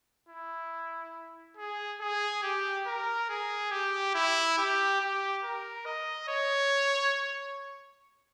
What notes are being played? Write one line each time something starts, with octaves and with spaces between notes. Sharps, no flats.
E4
G#4
G#4
G4
A#4
G#4
G4
E4
G4
G4
A#4
D#5
C#5